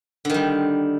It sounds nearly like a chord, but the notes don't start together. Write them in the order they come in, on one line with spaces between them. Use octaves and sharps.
D3 D#3 G3